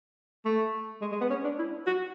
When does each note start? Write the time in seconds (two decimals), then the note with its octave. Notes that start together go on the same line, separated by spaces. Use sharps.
0.46 A3
1.02 G#3
1.12 G#3
1.21 B3
1.30 C#4
1.44 D4
1.59 E4
1.87 F#4